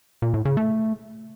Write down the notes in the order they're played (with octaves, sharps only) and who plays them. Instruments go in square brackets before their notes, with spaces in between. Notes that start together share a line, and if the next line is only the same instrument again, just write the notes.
[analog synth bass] A#2
A2
C#3
A3